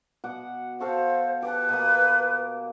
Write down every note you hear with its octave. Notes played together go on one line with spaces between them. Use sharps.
B2 F#5 D6
F#4 A4 C5 F5
G4 B4 A5
B2 A#3